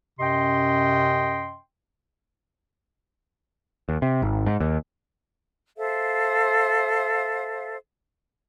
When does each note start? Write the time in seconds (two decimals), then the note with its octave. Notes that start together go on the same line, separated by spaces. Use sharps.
0.19 F#2 C3 C#4 D#5 G5 C6
3.89 D#2
4.02 C3
4.22 G#1
4.46 G#2
4.60 D#2
5.77 A4 C5 E5 F5